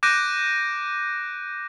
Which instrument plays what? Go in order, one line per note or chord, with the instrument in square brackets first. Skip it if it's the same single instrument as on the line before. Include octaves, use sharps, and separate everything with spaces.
[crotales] D6 F#6 G6 A#6 D7 D#7